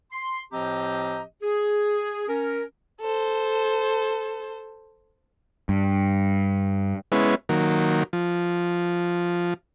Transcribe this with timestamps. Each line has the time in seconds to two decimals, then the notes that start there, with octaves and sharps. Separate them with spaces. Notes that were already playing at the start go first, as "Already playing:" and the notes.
0.12 C6
0.52 A2 F3 C4 G4 D#5 A#5
1.42 G#4
2.28 C#4 A#4
3.01 A4 C5
5.69 G2
7.12 G#3 B3 C#4 E4
7.49 D#3 F#3 A#3
8.13 F3